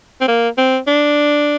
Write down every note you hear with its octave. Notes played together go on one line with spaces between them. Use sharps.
C4
A#3
C4
D4